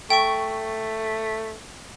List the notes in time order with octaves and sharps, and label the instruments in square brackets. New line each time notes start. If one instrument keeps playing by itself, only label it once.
[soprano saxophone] A3 [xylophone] G5 C#6